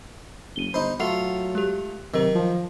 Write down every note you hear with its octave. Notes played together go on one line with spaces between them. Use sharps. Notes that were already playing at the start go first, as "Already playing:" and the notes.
F#1 D#7 G7
G1 D#4 C5 B5
F#3 A3 F4 F#5 C7 F7
G#3 G4
C3 D#3 F#3 A#4
F3